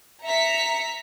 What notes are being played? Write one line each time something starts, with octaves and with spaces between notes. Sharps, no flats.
E5 A#5 B6 C#7